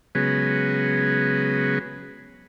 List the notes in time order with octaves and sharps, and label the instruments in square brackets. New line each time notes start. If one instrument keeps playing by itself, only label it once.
[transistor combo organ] C#3 F#3 G#3 B3